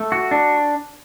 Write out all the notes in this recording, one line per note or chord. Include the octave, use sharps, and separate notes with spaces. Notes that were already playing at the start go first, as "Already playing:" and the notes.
Already playing: A3
F#4
D4